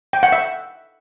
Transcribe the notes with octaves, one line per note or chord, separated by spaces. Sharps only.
G5
F#5
E5